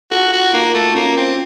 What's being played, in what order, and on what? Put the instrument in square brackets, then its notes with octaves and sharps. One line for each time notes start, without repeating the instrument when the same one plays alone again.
[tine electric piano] F4 A4 [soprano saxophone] F#4
[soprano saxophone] F#4
[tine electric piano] F4
[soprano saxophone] A#3 [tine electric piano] D#4 F#4
[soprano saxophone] A3
[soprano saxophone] A#3 [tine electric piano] C#4 F4
[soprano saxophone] C4